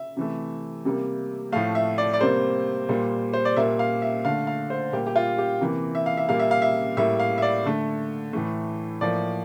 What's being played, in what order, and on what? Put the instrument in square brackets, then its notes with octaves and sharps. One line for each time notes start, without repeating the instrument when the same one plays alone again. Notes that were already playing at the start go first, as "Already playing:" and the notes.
Already playing: [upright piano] E5
C3 E3 A3
C3 G3 A#3
A2 F3 A3 F5
E5
D5
D5
C3 G3 A#3 C5
A#2 G3 A#3
C5
D5
A#2 G3 A#3 E5
F5
E5
D3 A3 F5
F5
C5
A#2 G3 A#3 G4
G4
F4
G4
C3 E3 A#3
E5
F5
E5
A#2 G3 A#3 F5
E5
F5
E5
A2 G3 A#3 E5
F5
E5
D5
D3 A3
A2 E3 A3
A2 F3 A#3 D5